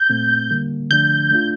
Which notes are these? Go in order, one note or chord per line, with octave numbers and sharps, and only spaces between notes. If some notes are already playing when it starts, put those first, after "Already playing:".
Already playing: G6
A#2 A3 C4
D3 G3 A#3
D3 F3 A3 D4 G6
A3 D4 F4